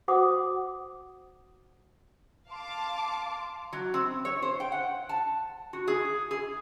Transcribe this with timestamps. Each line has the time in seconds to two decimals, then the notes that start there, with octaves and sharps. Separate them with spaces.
0.08 F#4 C5 F#5 D6 D#6
2.50 F5 A5 C6 D6
3.73 F#3
3.94 C4
4.25 C#5
4.42 C5
4.60 G5
4.72 F#5
5.09 A5
5.73 F#4
5.88 G#4
6.31 G#4